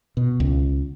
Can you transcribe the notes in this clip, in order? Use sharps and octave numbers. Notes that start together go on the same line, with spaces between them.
B2
C#2